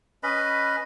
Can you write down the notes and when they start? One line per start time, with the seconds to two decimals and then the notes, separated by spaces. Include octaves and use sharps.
0.23 C#4 B4 D#5 B5